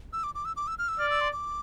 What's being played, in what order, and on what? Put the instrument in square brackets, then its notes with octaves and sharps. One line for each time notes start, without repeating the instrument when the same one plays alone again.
[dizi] E6
D6
D6
E6
D6
E6
F6
E6
[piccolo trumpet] D5 [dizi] F6
[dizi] E6
C6
D6